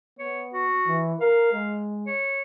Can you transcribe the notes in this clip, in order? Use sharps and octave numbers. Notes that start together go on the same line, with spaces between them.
B3 C#5
F#4
E3
A#4 F5
G#3
C#5